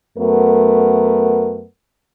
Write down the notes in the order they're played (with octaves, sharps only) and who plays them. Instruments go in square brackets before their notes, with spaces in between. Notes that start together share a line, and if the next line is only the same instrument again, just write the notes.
[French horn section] F#2 A3 B3 A#4